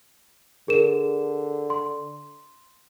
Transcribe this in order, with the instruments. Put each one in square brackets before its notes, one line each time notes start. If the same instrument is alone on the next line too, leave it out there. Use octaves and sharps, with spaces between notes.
[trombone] D3 [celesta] G#4 A#4 E7
[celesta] C6